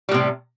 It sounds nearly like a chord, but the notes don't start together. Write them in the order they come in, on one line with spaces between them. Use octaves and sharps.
G3 A2 C3